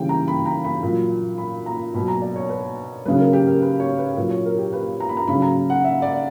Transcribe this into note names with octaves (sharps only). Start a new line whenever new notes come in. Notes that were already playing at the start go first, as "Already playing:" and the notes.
Already playing: C#3 E3 G3 G5
A#5
B5
A#5
B5
A#2 F#3
B5
A#5
B2 F#3 B5
A#5
D5
C#5
B4
C#3 F#3 B4
A#4
G4
A#4
B4
C#5
B4
A#2 F#3 B4
C#5
A#4
G4
B4
A#5
B5
A#5
C#3 F#3 B5
A#5
F#5
E5
D5